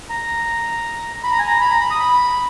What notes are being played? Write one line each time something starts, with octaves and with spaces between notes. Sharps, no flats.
A#5
B5
A#5
G#5
A#5
B5
A#5
B5
D#6
B5